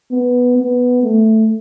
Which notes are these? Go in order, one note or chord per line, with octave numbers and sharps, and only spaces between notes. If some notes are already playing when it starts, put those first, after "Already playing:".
B3
B3
A3